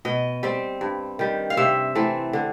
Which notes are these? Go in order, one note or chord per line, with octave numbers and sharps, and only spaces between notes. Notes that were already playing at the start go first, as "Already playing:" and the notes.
B2 D#5
G3 C4
G2
D#3 G3
F5
C3 E5
E3 A3 C4
D3